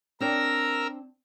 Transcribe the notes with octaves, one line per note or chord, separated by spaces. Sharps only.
C4 D4 A#4 C#5 A#5 E6